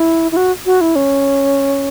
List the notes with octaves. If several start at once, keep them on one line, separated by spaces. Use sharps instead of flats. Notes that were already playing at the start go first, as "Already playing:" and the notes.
Already playing: E4
E4
F#4
F#4
E4
C#4